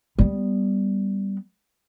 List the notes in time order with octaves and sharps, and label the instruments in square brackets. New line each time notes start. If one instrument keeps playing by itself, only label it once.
[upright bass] G3 B3